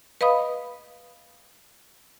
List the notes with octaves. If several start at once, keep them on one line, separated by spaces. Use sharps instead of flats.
B4 D#5 F5 B5 D#6